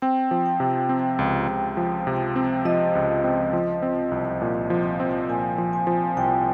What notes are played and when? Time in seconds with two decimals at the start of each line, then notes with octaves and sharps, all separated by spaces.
0.02 C4 G5
0.31 F3
0.46 G5
0.60 C3
0.89 C4
1.19 C#2
1.48 C#2
1.77 F3
2.07 C3
2.36 C4
2.65 F3 D#5
2.95 C#2
3.24 C4
3.53 F3
3.82 C4
4.12 C2
4.42 A#2
4.70 F3
5.00 C4
5.29 A#2 G#5
5.58 F3
5.73 G#5
5.87 F3
6.17 C2 G5